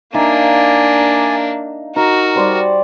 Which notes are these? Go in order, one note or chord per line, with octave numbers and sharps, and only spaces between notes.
A#3 D4 D#4 D5 E5 F5 G#5
D#4 F#4 A#4
G3 C5 D5